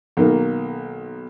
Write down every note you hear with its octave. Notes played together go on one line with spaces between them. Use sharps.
B1 D#3 A#3